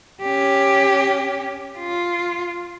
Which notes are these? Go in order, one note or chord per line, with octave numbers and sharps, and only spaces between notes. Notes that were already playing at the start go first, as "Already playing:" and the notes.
C#4 G4
F4